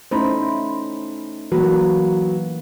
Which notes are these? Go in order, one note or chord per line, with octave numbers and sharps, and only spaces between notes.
A3 C#4 D#4 E4 C5 B5
E3 F#3 A#3 B4